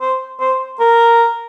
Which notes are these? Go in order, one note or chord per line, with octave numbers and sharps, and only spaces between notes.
C5
C5
A#4